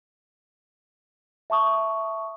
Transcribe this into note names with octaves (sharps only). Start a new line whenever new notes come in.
E5 A5 C#6 D#6